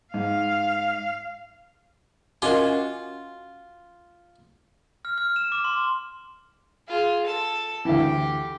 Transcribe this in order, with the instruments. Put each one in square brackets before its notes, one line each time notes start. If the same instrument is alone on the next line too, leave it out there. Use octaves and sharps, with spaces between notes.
[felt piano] G#2 [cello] F5
[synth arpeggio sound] C#4 F#4 G#5 [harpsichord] F4 [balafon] A#4 D#5 D6
[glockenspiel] F6
F6
E7
D6
C6
[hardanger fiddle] F4 G#4
A4 A5
[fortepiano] D2 E3 [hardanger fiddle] G4